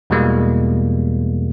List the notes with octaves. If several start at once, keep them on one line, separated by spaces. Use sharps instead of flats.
E2 B2 E3 G3 G#3 A#3